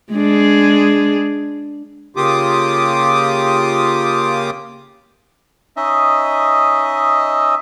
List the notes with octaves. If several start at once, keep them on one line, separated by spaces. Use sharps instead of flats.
G#3 D4 G#4
C#3 A#3 F4 G4 D6 D#6
C#4 D#4 D#5 E5